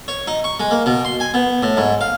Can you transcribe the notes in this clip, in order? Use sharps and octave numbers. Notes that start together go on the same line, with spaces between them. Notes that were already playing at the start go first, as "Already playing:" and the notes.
C#5
D#4
C#6
G#3
A#3
B2
C6
G#5
B3
A2
G#2
F5